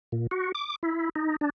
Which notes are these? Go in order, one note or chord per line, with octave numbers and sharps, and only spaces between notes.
A#2
F#4
D6
E4
D#4
D4